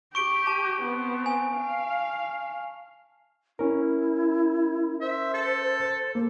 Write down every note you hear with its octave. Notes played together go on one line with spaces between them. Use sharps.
G4 C#6 D7 G7
A5
B3 C4
G#5
F5
C#4 E4 A#4
C5 E5
A4
A#3 A4